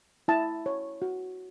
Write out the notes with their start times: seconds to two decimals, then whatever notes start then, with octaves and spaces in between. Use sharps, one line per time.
0.28 E4 A5
0.66 C#5
1.02 F#4